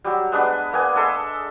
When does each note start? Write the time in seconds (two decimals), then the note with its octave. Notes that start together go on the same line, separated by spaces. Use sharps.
0.04 F#3 G3
0.32 G#3 B3 D4 B4
0.73 A#3 B3 G#5
0.96 G#3 A4 E5 C6